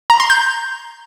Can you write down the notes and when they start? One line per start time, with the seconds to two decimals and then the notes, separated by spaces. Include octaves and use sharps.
0.10 A#5
0.20 C6
0.30 G6